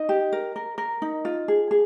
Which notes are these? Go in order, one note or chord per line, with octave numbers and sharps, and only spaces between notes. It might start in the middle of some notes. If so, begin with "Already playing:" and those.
Already playing: D#4 D#5
G4
A#4
A#4
A#4
D#4
F4
G#4
G#4